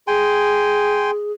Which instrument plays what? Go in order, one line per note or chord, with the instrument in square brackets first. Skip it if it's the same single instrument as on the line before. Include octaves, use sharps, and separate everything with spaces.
[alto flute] G#4 [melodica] G5 G#5 C6